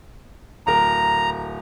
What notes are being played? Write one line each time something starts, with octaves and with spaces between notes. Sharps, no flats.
D1 A#4 A#5